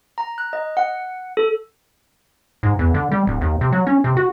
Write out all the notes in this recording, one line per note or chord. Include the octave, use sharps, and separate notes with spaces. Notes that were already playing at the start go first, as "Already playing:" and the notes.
A#5
F#6
D#5
F#5
A4
G#2
E2
D3
G3
D1
D#2
C3
F#3
C#4
C3
F#4